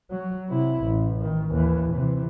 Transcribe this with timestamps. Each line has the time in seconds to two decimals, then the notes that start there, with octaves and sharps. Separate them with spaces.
0.11 F#3
0.49 C3 E4
0.83 A1
1.22 D#3
1.51 D#2 E3
1.93 C3 E3